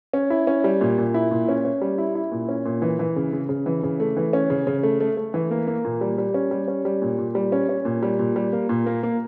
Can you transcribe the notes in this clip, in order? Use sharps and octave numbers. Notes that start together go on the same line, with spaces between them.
C#4
E4
C#4
G3
A#2
A#2
E4
A#2
C#4
C#4
G3
E4
E4
A#2
C#4
A#2
E3
E3
C#3
C#3
C#3
E3
C#3
A3
E3
C#4
C#3
C#3
A3
A3
A3
E3
A#3
A#3
A#2
G3
G3
C#4
G3
C#4
G3
A#2
A#2
G3
C#4
C#4
A#2
G3
A#2
G3
A#3
A#2
A#3
A#3